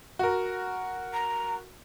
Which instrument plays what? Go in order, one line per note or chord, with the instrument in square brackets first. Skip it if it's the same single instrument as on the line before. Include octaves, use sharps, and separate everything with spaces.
[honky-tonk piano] F#4 A#4
[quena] A#5